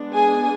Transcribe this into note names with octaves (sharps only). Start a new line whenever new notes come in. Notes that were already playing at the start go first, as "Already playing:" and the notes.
Already playing: G#3 B3 D4
G#4 G#5